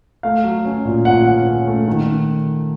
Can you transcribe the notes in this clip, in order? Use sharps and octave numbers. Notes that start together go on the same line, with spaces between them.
A3 F5
F#3
C#4
A#2
A#2 F#5
C#4
C#4
A3
D#3